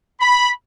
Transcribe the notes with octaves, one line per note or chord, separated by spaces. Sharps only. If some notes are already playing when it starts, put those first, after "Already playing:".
B5